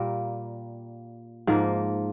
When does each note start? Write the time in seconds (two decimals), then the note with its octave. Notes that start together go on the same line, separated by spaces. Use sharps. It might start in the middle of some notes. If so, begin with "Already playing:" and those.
Already playing: A#2 G3 A#3
1.47 G#2 F3 A#3